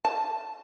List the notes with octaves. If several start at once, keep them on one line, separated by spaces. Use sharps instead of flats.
A5